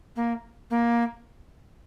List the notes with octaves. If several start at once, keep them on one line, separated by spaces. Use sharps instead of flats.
A#3
A#3